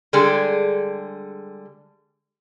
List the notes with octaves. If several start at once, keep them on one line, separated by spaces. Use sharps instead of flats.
D3 G3 G#3 G#4 A4